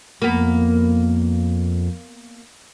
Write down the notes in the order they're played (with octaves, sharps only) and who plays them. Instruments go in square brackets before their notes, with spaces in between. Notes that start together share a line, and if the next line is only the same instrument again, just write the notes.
[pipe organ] F2 [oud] A#3 B3